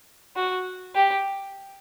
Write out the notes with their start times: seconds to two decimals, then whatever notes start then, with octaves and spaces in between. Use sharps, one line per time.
0.36 F#4
0.95 G4